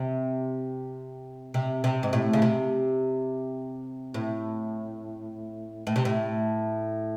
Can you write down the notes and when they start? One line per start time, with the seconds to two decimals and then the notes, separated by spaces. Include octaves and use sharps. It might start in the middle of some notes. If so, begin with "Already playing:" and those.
Already playing: C3
1.54 C3
1.84 C3
2.03 G#2
2.13 A2
2.33 C#3
2.42 C3
4.14 A2
5.87 A2
5.96 C3
6.05 A2